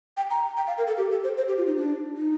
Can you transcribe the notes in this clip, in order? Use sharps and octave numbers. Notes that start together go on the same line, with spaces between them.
G5
A#5
G5
F5
A#4
A4
G4
A4
C5
C5
G4
F4
D#4
D4
D#4